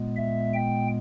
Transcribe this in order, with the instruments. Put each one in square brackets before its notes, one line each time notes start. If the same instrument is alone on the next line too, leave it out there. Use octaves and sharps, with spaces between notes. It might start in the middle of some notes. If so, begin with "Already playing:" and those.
Already playing: [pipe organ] A#2 G#3 B3
E5
G5